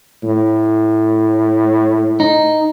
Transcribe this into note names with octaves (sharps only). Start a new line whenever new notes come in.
A2
D#4